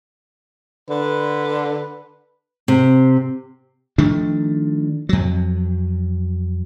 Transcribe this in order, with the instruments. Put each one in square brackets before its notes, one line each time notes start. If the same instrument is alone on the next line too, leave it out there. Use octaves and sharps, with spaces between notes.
[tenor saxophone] D3 [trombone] B4
[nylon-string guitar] C3
[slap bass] D#3 F3 A3 D4
F2 F#3